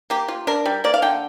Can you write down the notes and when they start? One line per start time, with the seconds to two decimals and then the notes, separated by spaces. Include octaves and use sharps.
0.10 A#3 G4
0.28 F4
0.47 D4 A#4
0.66 G3
0.84 A#3 D5
0.94 F5
1.02 D3 G5